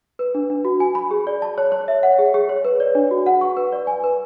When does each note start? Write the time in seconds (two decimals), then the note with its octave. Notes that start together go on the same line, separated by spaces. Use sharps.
0.19 B4
0.35 D4
0.50 D4
0.65 F#4
0.80 G#5
0.95 B5
1.11 G#4
1.27 D5
1.42 A5
1.58 C#5
1.72 C#5
1.88 E5
2.03 F#5
2.19 G#4
2.34 G#4
2.49 C#5
2.65 B4
2.80 D5
2.95 D4
3.11 F#4
3.26 F#5
3.41 C#6
3.57 B4
3.73 D5
3.87 G#5
4.04 B4